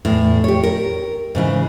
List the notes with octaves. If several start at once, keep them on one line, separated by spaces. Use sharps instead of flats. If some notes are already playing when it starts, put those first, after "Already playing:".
E2 A2
G4 C#5
A#4
G#2 C#3 E3